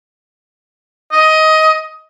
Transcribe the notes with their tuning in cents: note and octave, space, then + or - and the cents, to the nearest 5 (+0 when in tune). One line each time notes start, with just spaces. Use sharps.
D#5 +15